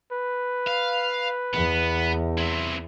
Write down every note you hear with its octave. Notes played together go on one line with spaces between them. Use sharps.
B4
F5
E2 B3
C4 E4